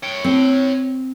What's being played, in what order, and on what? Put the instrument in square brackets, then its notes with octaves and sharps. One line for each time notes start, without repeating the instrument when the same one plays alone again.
[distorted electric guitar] C#5 G5
[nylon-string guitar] C4